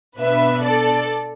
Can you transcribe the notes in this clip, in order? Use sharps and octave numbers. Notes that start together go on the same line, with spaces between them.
B2 B3 D4 B4 E5
A4 D5